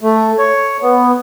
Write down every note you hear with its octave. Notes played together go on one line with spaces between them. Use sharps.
A3
C#5
B3